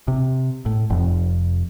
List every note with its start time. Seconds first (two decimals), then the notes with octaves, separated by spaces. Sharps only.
0.08 C3
0.66 A2
0.90 F1 F2